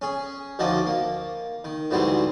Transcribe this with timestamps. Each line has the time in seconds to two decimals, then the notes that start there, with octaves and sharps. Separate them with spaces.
0.02 C#4 G#4
0.59 D2 D#3 F3 F#4 D5 D#5
0.86 A#3
1.64 D#3
1.91 D2 G#2 E3 F#3 G3 C4